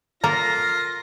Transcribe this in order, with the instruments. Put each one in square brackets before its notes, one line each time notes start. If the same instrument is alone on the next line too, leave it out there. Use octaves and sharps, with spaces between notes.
[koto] A#3 A4 A#4 [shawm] F4 [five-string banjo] A#5 [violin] A#6